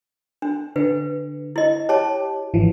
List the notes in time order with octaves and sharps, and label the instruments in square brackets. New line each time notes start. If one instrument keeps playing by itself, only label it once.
[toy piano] D4
[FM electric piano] D3 [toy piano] B4
[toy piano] E4 D#5
[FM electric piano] G4 [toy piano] C#5 A5
[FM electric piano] G#1 E3 F3